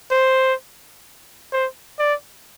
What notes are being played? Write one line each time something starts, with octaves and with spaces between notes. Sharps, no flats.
C5
C5
D5